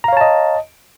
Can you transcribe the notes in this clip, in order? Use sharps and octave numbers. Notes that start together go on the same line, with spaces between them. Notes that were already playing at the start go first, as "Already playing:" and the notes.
C#5 D#5 F5 A5 A#5